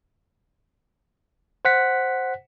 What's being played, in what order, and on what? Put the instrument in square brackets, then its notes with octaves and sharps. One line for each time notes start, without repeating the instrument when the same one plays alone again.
[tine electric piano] C5 F#5 B6